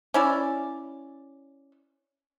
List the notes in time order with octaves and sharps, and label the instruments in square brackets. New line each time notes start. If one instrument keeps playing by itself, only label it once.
[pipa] C#4 E4 D5